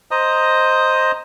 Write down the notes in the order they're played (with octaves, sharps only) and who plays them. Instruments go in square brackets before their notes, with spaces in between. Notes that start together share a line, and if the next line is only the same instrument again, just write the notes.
[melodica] C5 D#5 A#5 D#6